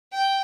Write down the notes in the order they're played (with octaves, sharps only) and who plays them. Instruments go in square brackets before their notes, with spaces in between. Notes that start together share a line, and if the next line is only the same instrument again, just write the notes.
[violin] G5